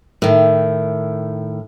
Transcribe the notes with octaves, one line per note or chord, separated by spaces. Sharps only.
A2 D#3